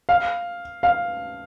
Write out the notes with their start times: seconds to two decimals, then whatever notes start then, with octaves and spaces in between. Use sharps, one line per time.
0.09 F5
0.83 F5